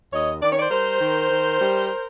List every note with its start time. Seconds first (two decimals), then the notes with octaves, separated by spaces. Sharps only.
0.12 D#2 C#5 D#5
0.41 D#3 D5
0.51 C#5
0.59 C5 D5
0.70 G3 A#4 C5
1.01 D#3
1.30 D#3
1.59 G3